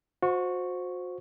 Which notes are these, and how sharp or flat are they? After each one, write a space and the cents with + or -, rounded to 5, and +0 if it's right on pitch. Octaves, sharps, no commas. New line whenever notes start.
F#4 -35 C5 +0 C#6 +0